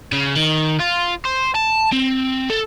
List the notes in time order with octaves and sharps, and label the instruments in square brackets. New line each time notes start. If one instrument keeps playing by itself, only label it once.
[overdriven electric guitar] C#3
D#3
F4
C5
A5
C4
A4